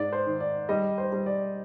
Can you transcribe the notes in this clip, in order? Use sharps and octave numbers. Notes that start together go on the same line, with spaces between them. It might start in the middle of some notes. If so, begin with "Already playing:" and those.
Already playing: G#2 D5
C5
D#3
D5
G3 D#5
C5
G3
D5